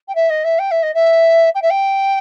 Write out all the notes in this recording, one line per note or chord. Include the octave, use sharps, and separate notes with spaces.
G5
E5
D#5
E5
G5
E5
D#5
E5
G5
E5
G5